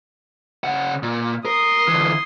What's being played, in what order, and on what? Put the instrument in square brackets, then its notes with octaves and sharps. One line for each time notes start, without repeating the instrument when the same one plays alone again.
[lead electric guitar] C#3 F#5
A#2
[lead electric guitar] A#4 [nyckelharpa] C6 D#6
[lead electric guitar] D3 E3